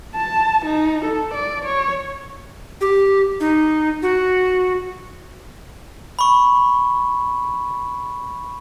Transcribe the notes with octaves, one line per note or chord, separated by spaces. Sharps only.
A5
D#4
A4
D5
C#5
G4
D#4
F#4
B5 C#6